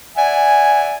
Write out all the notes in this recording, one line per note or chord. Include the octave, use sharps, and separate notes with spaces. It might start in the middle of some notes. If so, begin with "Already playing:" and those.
D5 E5 F#5 G#5